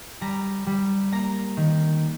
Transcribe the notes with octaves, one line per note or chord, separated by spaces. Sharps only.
G3 A#5
G3
A#3 A#5
D#3